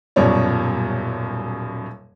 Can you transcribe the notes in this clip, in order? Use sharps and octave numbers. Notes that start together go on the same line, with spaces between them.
D#1 F#2 B2 G3 C#5 D5